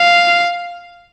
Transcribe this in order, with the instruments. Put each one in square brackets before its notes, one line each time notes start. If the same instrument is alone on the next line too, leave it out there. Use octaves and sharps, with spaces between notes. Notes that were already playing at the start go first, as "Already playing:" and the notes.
Already playing: [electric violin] F5